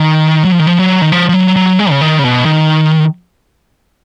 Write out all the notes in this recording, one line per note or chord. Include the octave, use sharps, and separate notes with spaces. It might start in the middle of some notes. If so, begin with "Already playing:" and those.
Already playing: D#3
F#3
F3
D#3
F3
F#3
D#3
F3
F3
F#3
F#3
G#3
C#3
D#3
C#3
B2
D#3